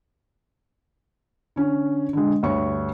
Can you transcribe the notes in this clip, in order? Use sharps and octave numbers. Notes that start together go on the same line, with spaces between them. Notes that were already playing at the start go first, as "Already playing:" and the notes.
D3 C#4
D3 G#3
D2 G2 C#5 C#6